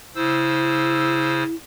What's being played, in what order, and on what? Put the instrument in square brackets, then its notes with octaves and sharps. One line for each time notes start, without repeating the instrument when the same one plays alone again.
[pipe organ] C#3 C5 E6 [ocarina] E4